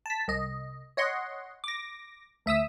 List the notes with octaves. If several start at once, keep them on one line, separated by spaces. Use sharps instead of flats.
A5 B6
C2 D#5
C#5 D#5 F#5 C6
D6 A#6
D2 E5 D#6 E6